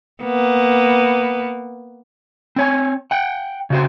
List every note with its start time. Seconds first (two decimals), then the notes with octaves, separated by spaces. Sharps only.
0.23 A#3 B3
2.56 C4 C#5 G#5
3.11 F#5 G5
3.70 C#3 F#4 C5